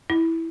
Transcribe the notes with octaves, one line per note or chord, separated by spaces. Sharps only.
E4